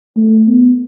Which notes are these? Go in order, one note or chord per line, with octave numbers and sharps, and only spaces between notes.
A3
B3